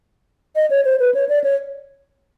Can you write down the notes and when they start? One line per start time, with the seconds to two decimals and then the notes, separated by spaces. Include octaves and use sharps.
0.56 D#5
0.70 C#5
0.85 C5
1.00 B4
1.14 C#5
1.29 D5
1.44 C#5